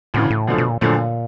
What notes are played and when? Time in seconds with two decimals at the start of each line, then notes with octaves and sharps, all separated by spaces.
0.14 D2 A2 C#3 E3
0.30 A2
0.47 F#2 B2 D3 F3 A3
0.58 B2
0.69 A#2
0.81 F#2 A#2 D3 F3 A3